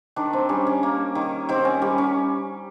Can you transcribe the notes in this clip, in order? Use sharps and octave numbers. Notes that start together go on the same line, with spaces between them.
D#3 D4
C4
G3 C#4
C#4
A#3
D#3
D#3 C4
C#4
G3 C#4
C#4